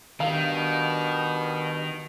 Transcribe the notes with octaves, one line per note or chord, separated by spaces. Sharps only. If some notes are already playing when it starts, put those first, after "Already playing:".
G2 B2 D#3 F5